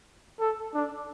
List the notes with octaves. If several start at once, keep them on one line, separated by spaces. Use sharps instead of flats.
A4
D4